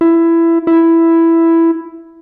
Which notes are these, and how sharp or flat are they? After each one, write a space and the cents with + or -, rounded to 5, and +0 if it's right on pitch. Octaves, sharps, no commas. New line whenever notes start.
E4 +15
E4 +5